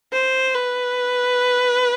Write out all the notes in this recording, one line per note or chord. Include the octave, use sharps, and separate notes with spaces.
C5
B4